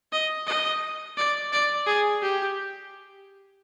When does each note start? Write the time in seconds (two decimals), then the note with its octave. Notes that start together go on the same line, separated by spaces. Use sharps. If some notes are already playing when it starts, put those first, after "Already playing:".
0.12 D#5
0.47 D#5
1.18 D5
1.53 D5
1.87 G#4
2.22 G4